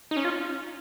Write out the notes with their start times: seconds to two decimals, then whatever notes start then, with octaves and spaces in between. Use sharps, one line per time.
0.11 D#4
0.17 C#4
0.25 F4